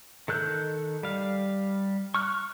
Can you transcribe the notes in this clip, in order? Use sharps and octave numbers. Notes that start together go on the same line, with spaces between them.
D#3 A4 F#6 G6
G3 F5
C#6 F6 F#6